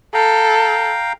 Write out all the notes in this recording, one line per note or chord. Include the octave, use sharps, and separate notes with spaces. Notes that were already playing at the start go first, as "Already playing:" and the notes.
A4 F5 G5 A#5